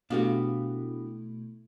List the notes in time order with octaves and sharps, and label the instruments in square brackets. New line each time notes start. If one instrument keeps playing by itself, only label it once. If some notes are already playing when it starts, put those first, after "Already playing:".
[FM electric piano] B2 A3 E4 [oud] B3 F5 [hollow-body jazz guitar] D4 F#4 G4